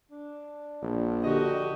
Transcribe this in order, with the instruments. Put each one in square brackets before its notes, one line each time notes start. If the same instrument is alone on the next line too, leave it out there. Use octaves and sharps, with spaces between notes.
[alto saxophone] D4
[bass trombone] A#1
[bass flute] D3 [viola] F#4 G4 [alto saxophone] D#5